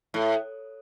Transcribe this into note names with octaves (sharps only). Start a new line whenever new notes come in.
A2